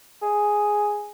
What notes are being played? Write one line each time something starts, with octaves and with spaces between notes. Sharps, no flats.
G#4